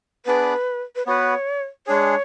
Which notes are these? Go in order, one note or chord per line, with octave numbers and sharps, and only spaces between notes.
B3 D4 G#4 B4 D5
B4
B3 F#4 B4 C#5
G#3 D4 G#4 C#5